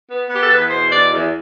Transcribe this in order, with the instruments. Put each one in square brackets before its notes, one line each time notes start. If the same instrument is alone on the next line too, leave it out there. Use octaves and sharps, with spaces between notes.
[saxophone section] B3
B3
G4
A4
E2 B4
B2 C5
E2 D5
E2